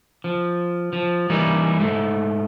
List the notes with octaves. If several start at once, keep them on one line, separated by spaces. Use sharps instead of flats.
F3
F3
E3 G3 A#3 D#4 E4
G#2 A3